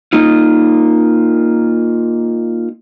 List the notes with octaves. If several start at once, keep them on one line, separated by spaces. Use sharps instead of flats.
A#3 D#4 F4